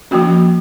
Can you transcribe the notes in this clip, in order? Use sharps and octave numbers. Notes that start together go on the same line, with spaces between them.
F3 A#3 C#4 F#4